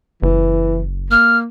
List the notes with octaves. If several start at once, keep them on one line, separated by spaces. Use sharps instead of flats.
F#1 E3
A#3 F6